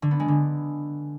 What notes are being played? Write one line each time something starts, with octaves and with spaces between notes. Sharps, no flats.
D3
B3
G#3
D3